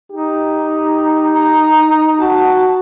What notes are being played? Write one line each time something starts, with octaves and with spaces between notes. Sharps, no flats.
D#4 G4
A#5
F#4 A5